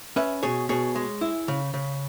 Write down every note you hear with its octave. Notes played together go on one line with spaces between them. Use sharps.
C#4 B4 E5
B2 G#4 C#5
B2 G#4 C#5
G#3
E4
C#3
C#3